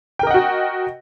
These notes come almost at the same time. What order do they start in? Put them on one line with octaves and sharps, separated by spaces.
G5 A#4 D#5 F#5 F#4